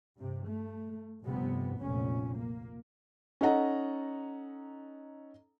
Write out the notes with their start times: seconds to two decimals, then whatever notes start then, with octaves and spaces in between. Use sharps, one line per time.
0.16 G2 C3
0.48 A3
1.24 F1 G2 C3 B3
1.78 F1 B1 A#2 C#4
2.35 A#3
3.41 C#4 D#4 A4 D#5 F#5 A#5